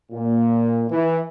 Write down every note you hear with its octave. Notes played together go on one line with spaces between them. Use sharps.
A#2
E3